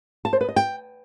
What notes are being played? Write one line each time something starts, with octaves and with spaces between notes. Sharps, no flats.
A5
C5
B4
D#5
G5